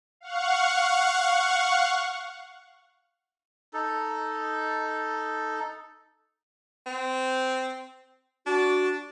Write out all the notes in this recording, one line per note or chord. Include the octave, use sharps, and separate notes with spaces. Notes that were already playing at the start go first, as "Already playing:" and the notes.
F5 F#5 C#6
D#4 A4
C4
D4 F#4